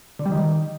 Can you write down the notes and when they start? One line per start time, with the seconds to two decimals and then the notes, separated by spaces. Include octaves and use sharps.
0.19 D3
0.26 G3
0.32 D#3